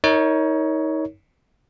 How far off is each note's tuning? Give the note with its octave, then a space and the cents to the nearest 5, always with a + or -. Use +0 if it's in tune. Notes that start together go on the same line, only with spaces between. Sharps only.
D#4 +30 A#4 -5 C#5 +10